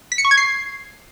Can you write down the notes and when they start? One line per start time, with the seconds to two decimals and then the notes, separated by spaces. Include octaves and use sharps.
0.12 B6
0.18 C#7
0.25 C#6
0.31 G#6
0.37 C7